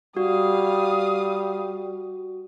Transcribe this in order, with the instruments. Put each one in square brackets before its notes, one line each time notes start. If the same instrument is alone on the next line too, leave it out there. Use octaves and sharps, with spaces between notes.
[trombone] G3 [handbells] F#4 [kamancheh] F5 D#6